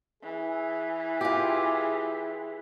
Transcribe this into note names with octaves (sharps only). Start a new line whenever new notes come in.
E3 G#4
F4 G4